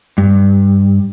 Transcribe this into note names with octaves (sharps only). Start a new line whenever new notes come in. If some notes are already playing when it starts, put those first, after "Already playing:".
G2